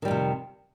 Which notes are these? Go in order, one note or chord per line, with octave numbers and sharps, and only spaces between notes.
F2 C3 D#3 G3